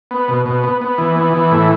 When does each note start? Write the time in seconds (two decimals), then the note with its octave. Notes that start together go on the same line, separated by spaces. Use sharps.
0.11 B3
0.28 B2
0.46 B2
0.64 B3
0.81 B3
0.98 E3
1.16 B3
1.34 E3
1.51 A2